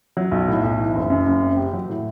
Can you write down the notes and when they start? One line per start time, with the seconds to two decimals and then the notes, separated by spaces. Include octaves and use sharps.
0.17 F#3
0.32 B1
0.48 A2
0.64 B1
0.79 E3
0.95 F#1
1.10 F#2
1.26 F#1
1.41 C4
1.57 G4
1.73 F#3
1.89 A2